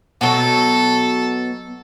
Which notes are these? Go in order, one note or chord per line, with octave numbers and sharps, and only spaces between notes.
B2 F#3 A4